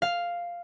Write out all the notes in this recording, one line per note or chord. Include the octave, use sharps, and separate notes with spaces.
F5